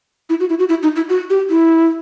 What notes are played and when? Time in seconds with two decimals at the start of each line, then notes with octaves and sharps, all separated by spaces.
0.30 E4
0.40 F#4
0.49 E4
0.59 F#4
0.69 E4
0.83 D#4
0.96 E4
1.09 F#4
1.30 G4
1.50 E4